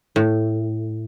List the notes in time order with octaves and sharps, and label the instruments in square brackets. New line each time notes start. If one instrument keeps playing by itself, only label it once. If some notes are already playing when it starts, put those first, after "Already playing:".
[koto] A2